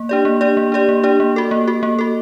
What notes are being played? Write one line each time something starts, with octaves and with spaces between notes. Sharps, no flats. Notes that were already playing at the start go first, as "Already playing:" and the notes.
Already playing: A#3
D4 G4 D5
A#3
D4 G4 D5
A#3
D4 G4 D5
A#3
D4 G4 D5
A#3
F#4 A4
A#3
F#4 A4
A#3
F#4 A4